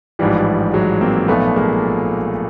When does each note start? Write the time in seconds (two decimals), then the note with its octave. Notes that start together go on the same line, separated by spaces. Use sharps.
0.19 A1 G#2 E3 F3 G3
0.74 F#3 G#3
1.01 A#3 C4
1.28 B1 A#2 F3 A3 B3
1.56 G#3 A#3